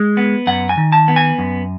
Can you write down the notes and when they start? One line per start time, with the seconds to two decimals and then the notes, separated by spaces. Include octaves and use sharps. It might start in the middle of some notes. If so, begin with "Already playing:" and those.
Already playing: G#3
0.17 B3
0.47 F#2 F#5
0.69 G#5
0.77 D#3
0.92 A5
1.08 B3
1.16 G#5
1.38 F#2